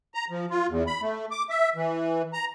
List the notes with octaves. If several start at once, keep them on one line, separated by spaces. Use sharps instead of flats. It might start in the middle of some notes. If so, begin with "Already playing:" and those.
A#5
F3
F4
E2
B5
A3
D6
E5
E3
A#5